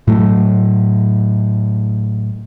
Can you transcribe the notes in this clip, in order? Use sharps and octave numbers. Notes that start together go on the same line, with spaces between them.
A2 F#3 A3